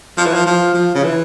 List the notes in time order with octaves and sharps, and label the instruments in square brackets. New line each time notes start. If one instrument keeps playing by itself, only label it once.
[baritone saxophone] F3
E3
F3
F3
F3
C#3
E3